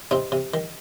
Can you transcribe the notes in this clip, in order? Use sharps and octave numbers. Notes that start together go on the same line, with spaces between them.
C3 C4 D#4
C3
D#3